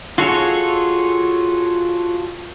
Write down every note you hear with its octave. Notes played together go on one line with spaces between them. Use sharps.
F4 F#4 G#4 A4 C#5